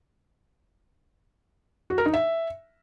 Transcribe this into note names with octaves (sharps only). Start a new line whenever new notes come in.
F#4
A#4
D#4
E5